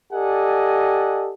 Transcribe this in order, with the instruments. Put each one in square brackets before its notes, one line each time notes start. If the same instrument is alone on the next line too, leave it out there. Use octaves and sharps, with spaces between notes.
[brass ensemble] G4 A4 D5 D#5 F#5 G#5